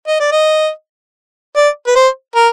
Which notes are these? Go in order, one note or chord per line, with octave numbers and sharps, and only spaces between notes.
D#5
D5
D#5
D5
B4
C5
A#4